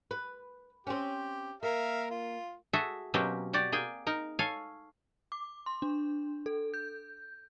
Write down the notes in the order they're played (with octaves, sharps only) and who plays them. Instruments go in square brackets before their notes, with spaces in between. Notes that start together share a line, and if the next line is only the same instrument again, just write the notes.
[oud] B4
[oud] C4 C#4 [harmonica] G4
[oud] A#3 [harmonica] A#4 E5 F5
[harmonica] F4
[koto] F#4 G#4 A4 E5
B2 F#3 A#3 C4 C#4 G4
F#4 G4 D5
A#3 G#4 G5 G#5
D#4 A#4
A4 C#5 F5 G#5
[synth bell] D6
C6
D4
A4
G6